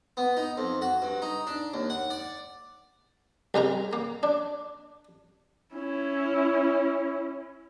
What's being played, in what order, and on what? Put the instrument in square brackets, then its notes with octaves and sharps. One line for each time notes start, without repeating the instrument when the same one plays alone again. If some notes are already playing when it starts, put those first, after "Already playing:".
[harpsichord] B3
D#4
F2
F#4
G2
D#4
D4
D#2
F#5
D5
C2 G#3 A#4 A#5
A#3
D4
[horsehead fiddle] C#4 E4